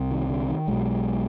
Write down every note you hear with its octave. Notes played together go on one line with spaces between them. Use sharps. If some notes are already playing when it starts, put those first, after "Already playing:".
Already playing: C2 C3
D#3
D3
D#3
B1 B2 G#3